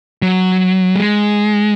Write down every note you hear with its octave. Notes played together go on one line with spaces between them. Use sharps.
F#3
G#3